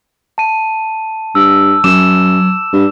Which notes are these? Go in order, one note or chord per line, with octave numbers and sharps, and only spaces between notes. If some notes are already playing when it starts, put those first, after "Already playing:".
A5 D#7
G2 E6
F#2 F#3 D6 E7
G2